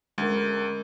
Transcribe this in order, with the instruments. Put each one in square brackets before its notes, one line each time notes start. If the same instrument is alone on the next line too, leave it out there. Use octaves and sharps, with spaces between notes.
[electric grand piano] D2 [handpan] G#3 C#4 A#4